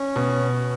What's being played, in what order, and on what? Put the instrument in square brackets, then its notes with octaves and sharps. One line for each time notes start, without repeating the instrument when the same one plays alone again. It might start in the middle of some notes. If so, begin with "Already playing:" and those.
Already playing: [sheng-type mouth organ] C#4
[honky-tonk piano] B2